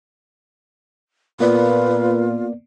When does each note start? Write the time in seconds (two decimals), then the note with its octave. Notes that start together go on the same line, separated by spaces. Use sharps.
1.40 A#2 A#3 B3 F4 B4 D5